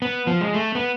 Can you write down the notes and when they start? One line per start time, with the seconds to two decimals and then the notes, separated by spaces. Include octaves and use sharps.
0.02 B3
0.27 F3
0.41 G#3
0.54 A3
0.75 B3